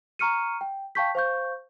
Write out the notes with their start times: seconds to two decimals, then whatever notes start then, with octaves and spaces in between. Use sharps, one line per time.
0.19 A#5 C#6 F6 C#7 D#7
0.61 G5
0.95 F5 G5 A5 C#6 G6 B6
1.15 C5 F5 C#6 G6